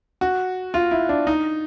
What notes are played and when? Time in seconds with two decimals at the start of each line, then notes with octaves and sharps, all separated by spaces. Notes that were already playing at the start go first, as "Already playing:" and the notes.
0.21 F#4
0.74 F4
0.91 E4
1.09 D4
1.27 D#4